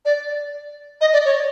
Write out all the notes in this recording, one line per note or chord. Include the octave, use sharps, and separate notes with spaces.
D5
D#5
D5
C#5